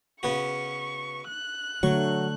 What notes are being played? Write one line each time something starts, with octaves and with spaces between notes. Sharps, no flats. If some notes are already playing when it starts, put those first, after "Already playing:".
C#3 B3 F#4 C#6
F#6
D3 F#3 A3 C#6